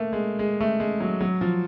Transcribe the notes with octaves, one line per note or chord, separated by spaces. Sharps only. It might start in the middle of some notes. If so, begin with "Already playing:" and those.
Already playing: A3 A#3
G#3
G#3
A3
G#3
F#3
F#3
F3